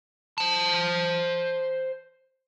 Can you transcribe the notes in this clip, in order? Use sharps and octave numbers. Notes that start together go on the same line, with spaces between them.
C5 A5